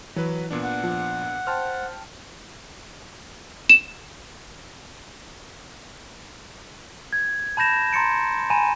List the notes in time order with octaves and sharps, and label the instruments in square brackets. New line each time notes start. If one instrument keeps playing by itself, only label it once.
[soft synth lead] E3 [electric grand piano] F#3 B4
[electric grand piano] A#2 B3 D4
[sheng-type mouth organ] F#5
[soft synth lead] F3
[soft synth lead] C5 [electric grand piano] G5 A5 F6
[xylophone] E7
[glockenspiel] G#6
A5 B5 G6 A#6 E7
A#5 C6 A6 C#7 D7
G#5 A#5 B5 D#7 E7